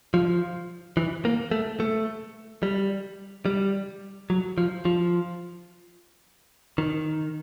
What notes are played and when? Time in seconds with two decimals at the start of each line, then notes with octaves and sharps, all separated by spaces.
0.14 F3
0.97 E3
1.25 A#3
1.51 A3
1.80 A3
2.63 G3
3.46 G3
4.30 F#3
4.58 F3
4.85 F3
6.78 D#3